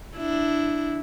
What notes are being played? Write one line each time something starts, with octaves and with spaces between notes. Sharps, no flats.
D4 E4